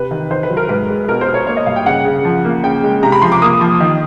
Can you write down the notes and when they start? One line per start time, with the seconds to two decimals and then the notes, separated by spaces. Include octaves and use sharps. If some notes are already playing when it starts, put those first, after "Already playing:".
Already playing: C3 B4
0.11 D#3
0.30 D#3 C5
0.43 B4
0.50 F#3
0.57 A#4
0.69 G#2 B4
0.89 G#3
1.04 B4
1.09 B2 A#4
1.21 C5
1.28 B2
1.34 C#5
1.47 A#3 C#5
1.57 D#5
1.66 G2 F5
1.76 G5
1.86 C#3 F#5
2.05 C#3
2.25 F3
2.44 A#3
2.63 C#3 G5
2.83 G#3
3.03 C3 A#5
3.12 B5
3.22 F3 C6
3.32 D6
3.42 A#3 D#6
3.61 F3
3.80 D#3